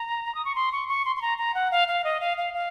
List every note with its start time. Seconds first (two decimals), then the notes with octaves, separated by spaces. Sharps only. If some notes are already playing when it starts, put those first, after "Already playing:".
Already playing: A#5
0.35 D#6
0.45 C#6
0.55 C6
0.72 C#6
0.88 C#6
1.05 C6
1.16 C6
1.22 A#5
1.38 A#5
1.54 F#5
1.71 F5
1.88 F5
2.04 D#5
2.20 F5
2.37 F5
2.54 F5